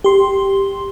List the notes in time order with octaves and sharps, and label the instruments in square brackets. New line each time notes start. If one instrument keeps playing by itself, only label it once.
[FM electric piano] G4 C6